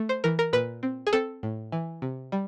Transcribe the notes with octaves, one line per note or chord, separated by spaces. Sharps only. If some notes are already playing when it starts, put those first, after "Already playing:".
Already playing: A3
C5
E3 A#4
A#4
A#2 B4
C4
G#4
C4 A4
A2
E3
C3
G3